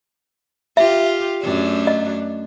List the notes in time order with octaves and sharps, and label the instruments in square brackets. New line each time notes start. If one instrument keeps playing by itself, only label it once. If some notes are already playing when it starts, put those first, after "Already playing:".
[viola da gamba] F4 G4 [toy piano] E5
[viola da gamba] F#2 A3 D4
[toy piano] D#5